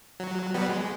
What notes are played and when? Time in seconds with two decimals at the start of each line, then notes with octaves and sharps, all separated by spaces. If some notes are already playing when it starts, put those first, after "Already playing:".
0.20 F#3
0.54 F#3 G3 B3
0.69 G#3